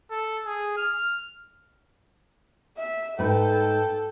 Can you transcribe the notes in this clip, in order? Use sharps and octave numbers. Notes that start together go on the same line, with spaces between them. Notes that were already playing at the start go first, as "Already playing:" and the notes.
A4
G#4
F6
E5
G#2 A4 B4 G5